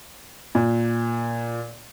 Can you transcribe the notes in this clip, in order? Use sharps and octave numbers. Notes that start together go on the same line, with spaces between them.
A#2